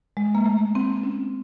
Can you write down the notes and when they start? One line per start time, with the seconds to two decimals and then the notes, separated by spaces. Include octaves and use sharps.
0.17 G#3
0.35 A#3
0.46 A3
0.75 C4
1.03 C#4